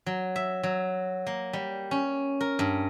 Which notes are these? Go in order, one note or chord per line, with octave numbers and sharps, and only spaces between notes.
F#3
E5
F#3
A#3
G3
C#4
A#4
G2